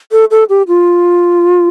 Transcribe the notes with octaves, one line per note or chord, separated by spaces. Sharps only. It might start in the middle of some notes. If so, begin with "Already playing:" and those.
A4
A4
G4
F4